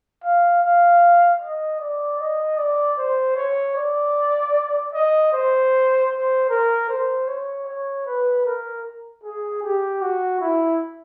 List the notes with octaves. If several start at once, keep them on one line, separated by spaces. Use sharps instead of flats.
F5
F5
D#5
D5
D#5
D5
C5
C#5
D5
D#5
C5
C5
A#4
C5
C#5
C#5
B4
A#4
G#4
G4
F#4
E4